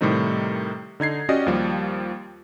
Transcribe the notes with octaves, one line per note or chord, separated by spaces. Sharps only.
A2 C3 D#3 G3 C4 D#4
D3 D#4 G#6 C7
C#4 F#4 G4 D5 D#5
D#2 F3 G3